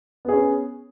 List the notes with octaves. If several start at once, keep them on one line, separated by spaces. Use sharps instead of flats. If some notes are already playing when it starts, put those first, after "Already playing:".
B3 C#4 G#4